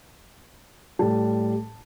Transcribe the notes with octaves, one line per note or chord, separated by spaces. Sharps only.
A2 G3 A5